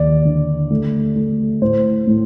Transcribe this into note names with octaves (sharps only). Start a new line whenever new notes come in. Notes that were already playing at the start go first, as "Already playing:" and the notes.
Already playing: D#2 D5
D3
A3
A3
A2 C5
A2